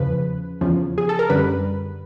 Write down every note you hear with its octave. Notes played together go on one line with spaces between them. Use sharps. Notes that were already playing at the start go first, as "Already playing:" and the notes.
Already playing: E2 C#3 F3 B4
E2 C#3 F3
G#4
A4
A#4
F#2 D3 G3 B4